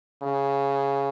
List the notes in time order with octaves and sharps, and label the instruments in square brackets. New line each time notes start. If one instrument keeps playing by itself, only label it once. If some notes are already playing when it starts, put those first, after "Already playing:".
[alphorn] C#3